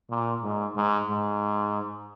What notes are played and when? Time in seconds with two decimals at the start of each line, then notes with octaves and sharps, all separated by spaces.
0.10 A#2
0.43 G#2
0.76 G#2
1.10 G#2